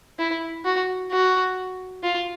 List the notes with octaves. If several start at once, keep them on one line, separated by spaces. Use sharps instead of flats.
E4
F#4
F#4
F4